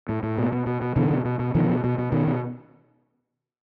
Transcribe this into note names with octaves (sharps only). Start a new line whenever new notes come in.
A2
A2
B2
B2
B2
B2
B2 D3 E3
B2
B2
B2
B2 D#3 F3
B2
B2
B2
B2 D#3
B2